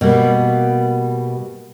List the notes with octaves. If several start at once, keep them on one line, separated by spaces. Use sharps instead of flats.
B2 G3 A#3